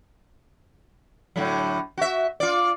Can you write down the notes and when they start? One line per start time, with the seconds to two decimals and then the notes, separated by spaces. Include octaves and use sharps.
1.36 A2 D3 F#3
1.98 F#4 E5
2.40 F4 D5